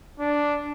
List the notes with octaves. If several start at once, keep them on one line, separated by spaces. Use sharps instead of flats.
D4